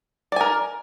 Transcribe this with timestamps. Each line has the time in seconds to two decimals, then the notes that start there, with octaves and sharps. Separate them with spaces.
0.32 D5
0.36 G#5
0.41 A#4